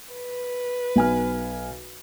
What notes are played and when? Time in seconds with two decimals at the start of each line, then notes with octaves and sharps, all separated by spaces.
0.13 B4
0.96 B1 G#5 F6